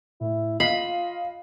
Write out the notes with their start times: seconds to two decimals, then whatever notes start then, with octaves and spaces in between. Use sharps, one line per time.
0.21 A2 E4
0.60 F4 D#5 F5 B5 C7